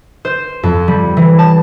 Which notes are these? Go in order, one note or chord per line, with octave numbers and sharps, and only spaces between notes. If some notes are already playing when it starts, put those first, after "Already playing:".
C5
F2
G3
E3
A5